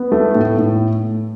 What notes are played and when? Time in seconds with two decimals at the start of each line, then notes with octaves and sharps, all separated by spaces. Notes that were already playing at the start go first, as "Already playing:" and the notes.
Already playing: B3
0.12 A3
0.35 A2
0.58 A2